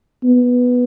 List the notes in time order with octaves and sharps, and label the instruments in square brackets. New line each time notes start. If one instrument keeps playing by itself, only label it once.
[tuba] B3